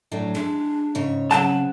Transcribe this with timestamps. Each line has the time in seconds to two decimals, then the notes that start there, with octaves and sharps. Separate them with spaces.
0.12 A2 F#3 D4
0.35 G#3 D4
0.95 G#2 C#3 C#5
1.31 C#3 F#3 C4 F#5 A5